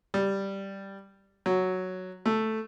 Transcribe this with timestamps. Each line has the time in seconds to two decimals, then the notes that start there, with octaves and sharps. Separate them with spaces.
0.14 G3
1.46 F#3
2.26 A3